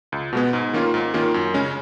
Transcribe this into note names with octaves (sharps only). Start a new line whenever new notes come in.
C#2
B2 G#3 B3
G#2
D#3 A#3 C#4 F4
G#2
D#3 A#3 C#4 F4
F#2
C#3 G#3 C#4